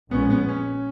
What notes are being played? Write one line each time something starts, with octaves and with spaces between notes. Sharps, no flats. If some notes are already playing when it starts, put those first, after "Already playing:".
A#1 A#2 G#3 B3 C#4
B3
C#4